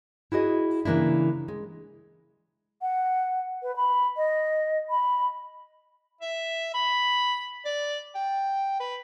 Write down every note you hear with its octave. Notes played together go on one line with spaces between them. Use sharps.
E4 F#4 G#4 D#5
C#3 E3 A#3 D4 E4
G#3
F#5
B4
B5
D#5
B5
E5
B5
D5
G5
B4